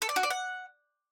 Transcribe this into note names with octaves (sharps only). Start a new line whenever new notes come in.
A4
D5
F#4
D5
F#5